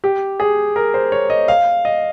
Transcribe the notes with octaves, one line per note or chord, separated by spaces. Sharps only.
G4
G#4
A#4
C5
C#5
D#5
F5
D#5